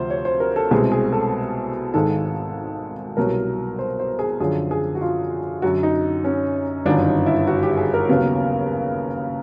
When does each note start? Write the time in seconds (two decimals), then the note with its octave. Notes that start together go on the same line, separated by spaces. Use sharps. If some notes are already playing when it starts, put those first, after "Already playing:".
Already playing: D2 C3 F3 C5
0.10 C#5
0.25 C5
0.40 A#4
0.56 A4
0.71 C2 B2 G#3 C4 G#4
0.92 G#4
1.12 A4
1.94 G#1 G#2 D#3 G#3 A4
3.17 C2 B2 F#3 A#4
3.79 C5
3.99 C5
4.19 G#4
4.40 F#2 D3 F3 G#4
4.71 G#4
4.95 F#4
5.01 F4
5.62 F#2 D3 F#3 F#4
5.83 D#4
6.24 C#4
6.85 G1 F#2 D#3 D4
7.05 D#4
7.26 E4
7.47 F#4
7.63 G4
7.77 G#4
7.94 A#4
8.09 D#2 C#3 F#3 B3